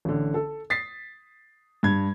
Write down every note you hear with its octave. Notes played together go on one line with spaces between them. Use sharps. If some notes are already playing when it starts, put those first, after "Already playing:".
A1 D3
A4
D#6 A6 B6 C7
G2 G#6